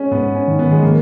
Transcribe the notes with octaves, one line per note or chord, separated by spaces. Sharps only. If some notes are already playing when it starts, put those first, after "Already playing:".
Already playing: G#3 C#4
G#2 B3
C#4
D#3
B3
G#3
F3 A#3